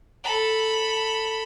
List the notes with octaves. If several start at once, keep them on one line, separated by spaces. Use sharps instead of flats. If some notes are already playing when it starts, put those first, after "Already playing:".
A4 B5